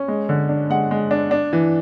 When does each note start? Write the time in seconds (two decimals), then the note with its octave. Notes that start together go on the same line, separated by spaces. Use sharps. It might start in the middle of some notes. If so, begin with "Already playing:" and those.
Already playing: C#4
0.08 G#3
0.29 D3
0.49 D4
0.70 G#3 F#5
0.91 G#3
1.11 D4
1.31 D4
1.53 E3